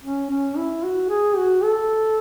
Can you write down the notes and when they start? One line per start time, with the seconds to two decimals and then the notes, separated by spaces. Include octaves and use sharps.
0.03 C#4
0.30 C#4
0.58 E4
0.83 F#4
1.09 G#4
1.37 F#4
1.62 A4